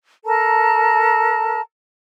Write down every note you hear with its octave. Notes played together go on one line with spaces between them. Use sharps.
A4 A#4 A5 A#5